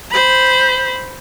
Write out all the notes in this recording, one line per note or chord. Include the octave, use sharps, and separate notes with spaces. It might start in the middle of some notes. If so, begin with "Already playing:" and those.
C5 B5